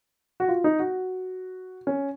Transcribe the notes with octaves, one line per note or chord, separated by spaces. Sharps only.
F#4
F4
D#4
F#4
C#4